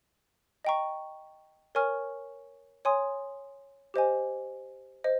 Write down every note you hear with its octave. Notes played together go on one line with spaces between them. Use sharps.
D#5 G5 A#5 C#6
A#4 C#5 G#5 C#6 F6
C#5 G#5 C6 D#6
G4 C5 D#5 G#5
C5 D#5